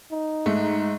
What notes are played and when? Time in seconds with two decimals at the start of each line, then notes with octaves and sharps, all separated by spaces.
0.12 D#4
0.46 G#2 A3